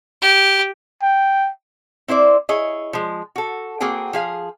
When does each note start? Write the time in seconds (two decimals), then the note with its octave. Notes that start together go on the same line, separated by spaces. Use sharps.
0.22 G4
1.03 G5
2.08 C4 E4 C5 D5
2.49 E4 G#4 C#5 D#5
2.93 F3 G#3
3.36 F#4 A4
3.80 A#3 C4 F#4 G#4 G5
4.13 F3 G#4 F5